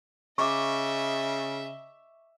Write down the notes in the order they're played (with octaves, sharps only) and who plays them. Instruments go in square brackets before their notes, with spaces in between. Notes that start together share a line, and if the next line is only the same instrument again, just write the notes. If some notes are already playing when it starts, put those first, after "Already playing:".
[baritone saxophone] C#3 [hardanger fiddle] D#5 E5 [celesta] C#6 D6